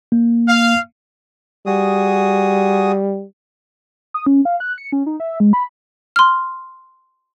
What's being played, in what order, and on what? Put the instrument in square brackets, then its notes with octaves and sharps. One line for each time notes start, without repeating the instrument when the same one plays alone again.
[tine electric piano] A#3
[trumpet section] F5
[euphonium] G3 [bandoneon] F#4 G#4 D#6
[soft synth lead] D#6
C#4
F5
F#6
C#7
C#4
D#4
E5
G#3
B5
[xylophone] C6 F6